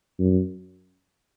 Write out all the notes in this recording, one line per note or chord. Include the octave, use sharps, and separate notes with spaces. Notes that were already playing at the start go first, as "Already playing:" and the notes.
F#2